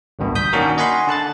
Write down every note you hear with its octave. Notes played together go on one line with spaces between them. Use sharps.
A1 D2 G2 B2
D#6 G6 B6
D#3 A#3 C#4 D4 F#4 A#4
D#5 F#5 G#5 B5 C6
D3 A5 F#6 A6